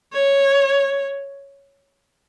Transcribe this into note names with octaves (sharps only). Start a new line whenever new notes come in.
C#5